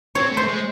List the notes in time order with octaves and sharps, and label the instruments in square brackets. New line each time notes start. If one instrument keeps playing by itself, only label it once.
[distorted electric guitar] C4 [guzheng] C#5
[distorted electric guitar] A3 [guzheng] C5
[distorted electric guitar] G#3